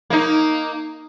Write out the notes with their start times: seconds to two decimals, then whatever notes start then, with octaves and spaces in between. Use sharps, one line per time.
0.10 A#3 D#4